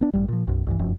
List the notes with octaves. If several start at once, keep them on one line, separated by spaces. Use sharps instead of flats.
B3 D4
A1 G2 G3
A#2 F3
B1 F#2
C2 G2 E3
F1 F#2 F3